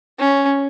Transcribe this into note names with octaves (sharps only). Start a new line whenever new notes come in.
C#4